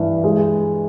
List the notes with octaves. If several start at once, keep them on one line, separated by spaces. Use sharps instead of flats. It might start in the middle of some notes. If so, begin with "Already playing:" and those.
Already playing: G2 E3
G#3